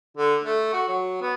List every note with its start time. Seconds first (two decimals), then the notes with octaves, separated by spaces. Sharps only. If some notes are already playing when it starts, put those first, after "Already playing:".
0.17 D3
0.44 A3
0.73 F#4
0.88 F#3
1.22 B3